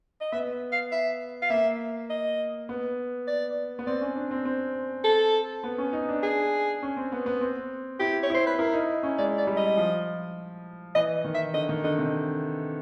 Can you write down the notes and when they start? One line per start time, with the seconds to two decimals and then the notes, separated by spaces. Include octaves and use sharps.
0.21 D#5
0.32 B3 E5
0.72 F5
0.92 E5
1.42 F5
1.50 A#3 E5
2.10 D#5
2.69 B3
3.27 D5
3.79 B3
3.87 C4 D5
4.01 C#4
4.16 D4
4.31 C4
4.45 C4
5.04 A4
5.64 B3
5.78 C#4
5.93 D#4
6.09 D4
6.23 G#4
6.83 C#4
6.97 C4
7.12 B3
7.26 B3
7.41 C4
8.00 E4 G4
8.23 C#5
8.30 E4 C5
8.47 B4
8.59 E4 A#4
8.73 D#4
9.03 C#4
9.18 G#3 D5
9.38 D5
9.47 G3
9.57 D#5
9.77 F3
10.95 E3 D#5
11.24 D#3
11.35 E5
11.54 D3 D#5
11.69 D#3
11.84 D3 D#5
11.98 C3